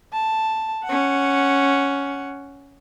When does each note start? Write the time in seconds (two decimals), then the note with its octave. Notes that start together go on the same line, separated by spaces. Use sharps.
0.13 A5
0.85 C#4 F#5